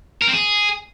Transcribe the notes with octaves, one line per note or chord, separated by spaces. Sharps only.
A#4
C4
G#4